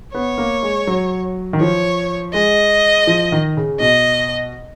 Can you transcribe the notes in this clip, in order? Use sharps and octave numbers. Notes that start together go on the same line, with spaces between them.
B3 C#5
A#3
G#3
F#3
D#3
F3 C#5
G#3 D#5
F3
D#3
C#3
B2 D#5